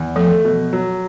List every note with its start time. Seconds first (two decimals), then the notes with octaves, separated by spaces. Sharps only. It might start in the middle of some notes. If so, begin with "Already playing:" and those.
Already playing: E2
0.16 F3 A3
0.45 B2
0.73 F#3